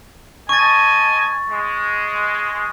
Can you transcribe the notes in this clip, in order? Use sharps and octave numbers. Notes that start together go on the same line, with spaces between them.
D#5 G#5 A5 C#6 A6
G#3